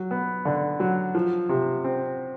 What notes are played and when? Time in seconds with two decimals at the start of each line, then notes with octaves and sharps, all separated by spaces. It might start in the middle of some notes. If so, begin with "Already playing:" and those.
Already playing: F#3
0.11 B3
0.45 D3
0.80 F#3
1.15 F3
1.49 C3
1.84 C4